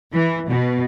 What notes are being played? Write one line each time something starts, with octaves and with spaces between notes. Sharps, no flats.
E3
B2